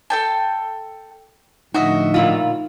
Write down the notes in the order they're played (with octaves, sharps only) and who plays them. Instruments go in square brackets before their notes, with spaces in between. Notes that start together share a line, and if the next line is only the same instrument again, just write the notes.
[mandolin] A4 G5 A5
[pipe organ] A2 D3 F3 [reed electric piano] D#4 [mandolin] F#4 D#5 E5
[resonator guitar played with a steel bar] A#2 E4 F4